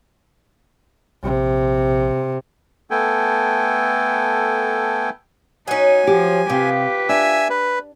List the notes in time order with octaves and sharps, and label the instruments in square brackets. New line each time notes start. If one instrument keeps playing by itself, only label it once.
[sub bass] A#1 [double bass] C3
[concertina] A3 B3 A4 G5 G#5
[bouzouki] F#3 C#4 [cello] D#4 [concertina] G#5
[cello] F3 [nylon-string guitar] G4
[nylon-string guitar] C3 [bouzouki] F3 [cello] G4 B4
[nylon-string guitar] D4 [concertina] E5 G#5 E6
[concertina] B4